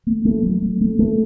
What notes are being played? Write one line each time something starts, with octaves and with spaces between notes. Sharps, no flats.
A3
A3
F#3
A3
A3
A3